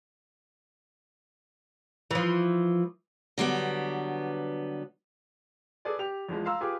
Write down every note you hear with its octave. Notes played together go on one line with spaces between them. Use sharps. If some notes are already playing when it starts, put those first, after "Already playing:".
E3 F3
D3 F#3 G3 B3
G#4 A4 B4 D5 G#5
G4 F7
E2 E3 F3 G#3
F5 A#5 C6 E6
F4 G4 G#4 B4 G#5 D6